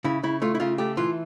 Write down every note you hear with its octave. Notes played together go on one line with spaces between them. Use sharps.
C#3 E4
C#3 E4
A3 F4
E4
C#3 F4
A3 G4
E3 F4